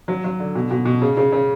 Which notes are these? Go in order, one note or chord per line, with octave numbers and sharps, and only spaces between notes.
F#3
F#3
D3
B2
B2
B2
C#3
C#3
C#3